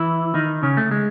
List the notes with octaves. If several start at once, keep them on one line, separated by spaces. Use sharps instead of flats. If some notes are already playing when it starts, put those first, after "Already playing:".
Already playing: E3 E4
D#3 D#4
C#3 C#4
A3
G#3